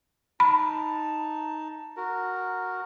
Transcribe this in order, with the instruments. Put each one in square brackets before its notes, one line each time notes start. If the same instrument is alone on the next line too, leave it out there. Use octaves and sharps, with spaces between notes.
[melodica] D#4 A5 [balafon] B5
[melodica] F#4 A#4